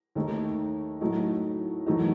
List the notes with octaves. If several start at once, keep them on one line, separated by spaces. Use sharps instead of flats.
D#2 D#3 A3 D#4
A2 F#3 A3 D#4
E2 D#3 F#3 A3 D#4